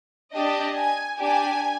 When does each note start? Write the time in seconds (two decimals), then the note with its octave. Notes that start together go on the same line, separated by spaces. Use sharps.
0.33 D4 G4 D#5
0.75 G#5
1.17 D4 G4 G#5